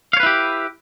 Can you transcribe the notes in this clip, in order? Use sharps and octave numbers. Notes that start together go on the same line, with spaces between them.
E4 G4 B4 C#5 F5